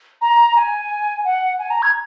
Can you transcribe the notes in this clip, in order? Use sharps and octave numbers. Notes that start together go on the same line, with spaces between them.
A#5
G#5
F#5
G#5
A#5
G#6